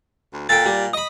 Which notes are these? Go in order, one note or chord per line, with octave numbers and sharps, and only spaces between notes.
D2
A#2 A4 G5 A6
G3
D#5 B5 D#6